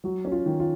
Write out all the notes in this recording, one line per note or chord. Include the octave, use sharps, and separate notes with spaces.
F#3 F#4
C#4
F4
D#3
F4